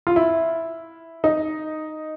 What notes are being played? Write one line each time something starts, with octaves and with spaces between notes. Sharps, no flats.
F4
E4
D#4